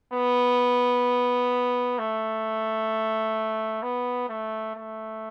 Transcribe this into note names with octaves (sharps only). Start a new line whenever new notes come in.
B3
A3
B3
A3
A3